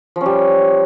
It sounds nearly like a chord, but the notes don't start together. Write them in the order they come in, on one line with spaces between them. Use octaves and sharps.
F3 C#4 G3